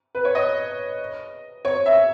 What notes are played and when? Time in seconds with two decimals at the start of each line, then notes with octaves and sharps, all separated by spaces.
0.15 B4
0.25 C#5
0.35 D#5
1.65 C#5
1.86 E5